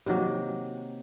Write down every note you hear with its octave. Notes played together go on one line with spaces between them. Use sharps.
C3 D#3 F#3 A#3